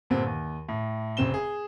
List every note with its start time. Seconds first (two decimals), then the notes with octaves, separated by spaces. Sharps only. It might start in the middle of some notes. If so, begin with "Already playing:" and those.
0.10 G2 A#2 D3 C4
0.26 D#2
0.69 A2
1.17 F1 C#3 C4 E7 G7
1.34 G#4